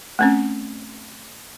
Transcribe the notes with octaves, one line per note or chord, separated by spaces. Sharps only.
A3 C4 C#4